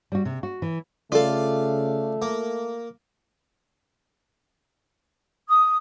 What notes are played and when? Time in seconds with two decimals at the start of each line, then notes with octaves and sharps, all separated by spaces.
0.12 G3 F#4
0.25 C3
0.43 F#4
0.62 E3
1.12 C#3 A3 F4 A4 D5 F5
2.22 A#3
5.48 D#6